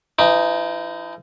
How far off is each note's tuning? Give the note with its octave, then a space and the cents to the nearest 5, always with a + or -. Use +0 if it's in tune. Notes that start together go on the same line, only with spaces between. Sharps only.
E3 +45 D#4 +0